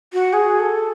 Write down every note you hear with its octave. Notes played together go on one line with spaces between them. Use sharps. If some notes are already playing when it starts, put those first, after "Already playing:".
F#4
G#4
A4